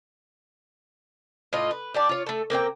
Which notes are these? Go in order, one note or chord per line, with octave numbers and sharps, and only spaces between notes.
A2 F4 D#5
B4
G4 D5 A5
F4 C#5
A3 A4
A#3 C4 D5 G5